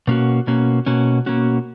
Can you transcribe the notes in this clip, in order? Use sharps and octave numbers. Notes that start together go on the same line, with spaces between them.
B2 A#3 C#4 F#4
B2 A#3 C#4 F#4
B2 A#3 C#4 F#4
B2 A#3 C#4 F#4